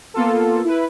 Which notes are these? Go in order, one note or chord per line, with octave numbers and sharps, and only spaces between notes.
A#3 B3 F4 A4
E4 B4